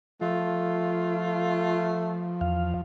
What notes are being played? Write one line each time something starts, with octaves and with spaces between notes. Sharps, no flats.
F3 A3 F4
E2 F5